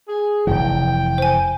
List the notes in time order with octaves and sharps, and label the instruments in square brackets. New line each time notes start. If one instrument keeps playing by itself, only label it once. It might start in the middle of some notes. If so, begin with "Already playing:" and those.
[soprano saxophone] G#4
[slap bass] F1 C2 E3 [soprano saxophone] G5
[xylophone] C5 G#5